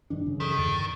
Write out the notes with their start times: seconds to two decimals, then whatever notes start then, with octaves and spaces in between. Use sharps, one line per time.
0.10 G2 D#3 D4
0.26 F#2 C#3
0.40 D#3 E3 G#4 A4
0.58 E2 G2 D3